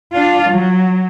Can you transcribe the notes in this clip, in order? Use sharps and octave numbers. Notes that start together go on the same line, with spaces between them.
D4 F4
F#3